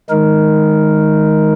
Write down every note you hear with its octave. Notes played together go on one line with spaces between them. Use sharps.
D#3 G#3 D#4 A#4